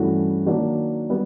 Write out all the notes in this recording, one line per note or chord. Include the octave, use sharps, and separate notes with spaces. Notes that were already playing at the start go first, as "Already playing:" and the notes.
Already playing: G2 E3 A3 C#4 F#4
D#3 F#3 A#3 D4 F#4
G3 B3